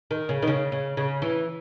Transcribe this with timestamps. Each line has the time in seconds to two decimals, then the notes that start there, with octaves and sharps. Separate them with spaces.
0.11 D#3
0.29 C#3
0.42 D#3
0.47 C#3
0.72 C#3
0.97 C#3
1.22 E3